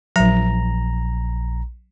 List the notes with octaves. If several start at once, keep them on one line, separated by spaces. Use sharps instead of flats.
A#1 F#3 A#5